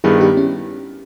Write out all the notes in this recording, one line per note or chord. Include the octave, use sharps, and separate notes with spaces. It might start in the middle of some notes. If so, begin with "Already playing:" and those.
G2 D#3 G3 B3 E4 G#4
D#4 G4
C#4 E4